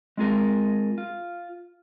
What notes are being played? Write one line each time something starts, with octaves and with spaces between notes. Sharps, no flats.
G#3 C4 F4 G#4 A#4
F4